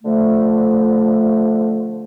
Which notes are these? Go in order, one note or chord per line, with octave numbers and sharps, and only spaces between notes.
D3 F3 A3